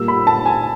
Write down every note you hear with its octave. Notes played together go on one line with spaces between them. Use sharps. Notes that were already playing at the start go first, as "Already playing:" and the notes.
Already playing: A#2 G3 A#3 E6
B5
A5
G#5